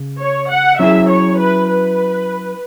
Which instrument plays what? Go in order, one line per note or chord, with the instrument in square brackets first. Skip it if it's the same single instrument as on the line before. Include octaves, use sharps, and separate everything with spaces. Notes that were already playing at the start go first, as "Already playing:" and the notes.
Already playing: [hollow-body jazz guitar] C#3
[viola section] C#5
F#5
[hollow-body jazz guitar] F#3 C#4 E4 G#4 [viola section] E5
[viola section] C#5
B4
B4